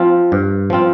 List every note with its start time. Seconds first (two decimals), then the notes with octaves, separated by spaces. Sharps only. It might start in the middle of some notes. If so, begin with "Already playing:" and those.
Already playing: F3 C4 F4
0.32 G2
0.70 F3 C4 F4